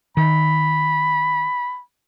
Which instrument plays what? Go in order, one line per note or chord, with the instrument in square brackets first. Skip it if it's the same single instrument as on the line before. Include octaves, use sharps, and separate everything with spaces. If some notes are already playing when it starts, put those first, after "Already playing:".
[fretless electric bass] D#3 [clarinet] B5